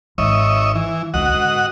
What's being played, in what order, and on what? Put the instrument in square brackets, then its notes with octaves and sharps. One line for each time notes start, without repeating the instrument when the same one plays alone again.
[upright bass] G#1 [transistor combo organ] C#5 D#5 E5
[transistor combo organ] E3
[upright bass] C#2 D3 [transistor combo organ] F#4 D#5 F#5
[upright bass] G#2 D3